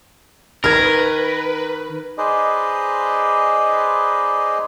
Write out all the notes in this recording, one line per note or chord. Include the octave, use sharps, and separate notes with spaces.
D#3 A#4 B4 F6 G#6
D#4 G#4 B4 C5 D5 D#5